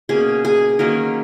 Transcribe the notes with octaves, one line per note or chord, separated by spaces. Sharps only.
B2 A#3 C#4 G#4
G#4
D#3 F#3 A#3 C#4 A#4